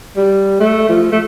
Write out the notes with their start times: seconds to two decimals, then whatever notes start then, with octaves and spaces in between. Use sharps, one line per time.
0.17 G3
0.60 A3
0.89 F3
1.12 A3